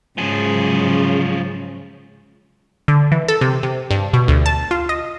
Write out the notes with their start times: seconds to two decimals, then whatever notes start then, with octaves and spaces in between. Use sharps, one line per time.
0.18 G#2 C#3 F3 F#3 G#4
2.88 D3
3.12 E3
3.28 A4
3.41 C3
3.63 C3
3.91 G2
4.13 B2
4.28 D2
4.46 A5
4.71 F4
4.89 D#5